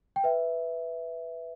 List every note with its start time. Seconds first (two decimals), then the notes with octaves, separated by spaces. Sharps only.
0.16 G5
0.24 B4 E5